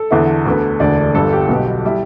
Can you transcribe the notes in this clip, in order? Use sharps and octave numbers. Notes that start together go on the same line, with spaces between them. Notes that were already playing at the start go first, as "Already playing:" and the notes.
Already playing: A4
E2 D3 B3 E4
D2 D3 B3
E1 D2 D3 D5
G1 G2 G3 A4
G4
B1 B2 B3
G3 E4